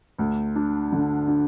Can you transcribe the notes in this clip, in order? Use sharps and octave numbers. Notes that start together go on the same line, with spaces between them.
D2
D4
D3
D4